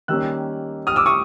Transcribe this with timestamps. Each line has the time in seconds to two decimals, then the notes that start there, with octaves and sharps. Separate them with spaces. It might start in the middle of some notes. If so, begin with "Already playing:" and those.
0.08 D#3 G3 A#3 C#4 E6 F#6
0.87 D#6 F6
0.96 D6 E6
1.06 C#6 D#6